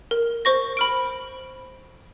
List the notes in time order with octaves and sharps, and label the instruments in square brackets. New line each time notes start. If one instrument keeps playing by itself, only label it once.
[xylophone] A#4
C5 C#6 A#6
B5 F6 D7